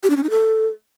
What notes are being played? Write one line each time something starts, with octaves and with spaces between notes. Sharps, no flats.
G4
D4
C#4
D#4
A4